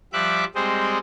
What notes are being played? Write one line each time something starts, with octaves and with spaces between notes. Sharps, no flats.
F3 G3 E5 D6 F#6
G3 G#3 C4 C5 D#5